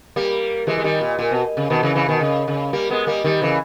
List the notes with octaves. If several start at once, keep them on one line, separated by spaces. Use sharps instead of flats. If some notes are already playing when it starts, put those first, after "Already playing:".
G3 A#3
E3 G#3
G#3
D#3 G3
A#2
A#2
B2
C#3
B2 D#3
C#3 E3
C#3 E3
B2 D#3
C#3
C#3
G3 A#3
G#3 B3
G3 A#3
D#3 G3
C#3 E3